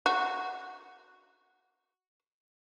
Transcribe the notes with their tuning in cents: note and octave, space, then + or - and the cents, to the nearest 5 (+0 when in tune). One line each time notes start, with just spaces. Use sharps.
F#4 +0